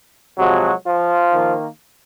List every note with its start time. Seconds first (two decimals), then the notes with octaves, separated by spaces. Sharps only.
0.38 C3 F3 F#3 G#3 F#4
0.85 F3 F4
1.33 D#3 A#3